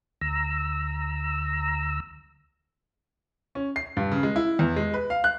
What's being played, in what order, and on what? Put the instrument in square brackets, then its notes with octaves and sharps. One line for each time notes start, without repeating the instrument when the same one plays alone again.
[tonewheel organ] D2 A#5 E6
[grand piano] C#4
C7
G2
C#3
G#3
E4
E2
G#3
B4
F5
F#6